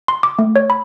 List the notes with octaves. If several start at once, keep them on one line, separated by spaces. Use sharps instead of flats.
C6
D6
A3
C#5
B5